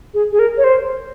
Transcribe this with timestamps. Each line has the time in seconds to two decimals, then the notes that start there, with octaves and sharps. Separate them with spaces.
0.14 G#4
0.32 G#4
0.39 A#4
0.57 C#5
0.64 C5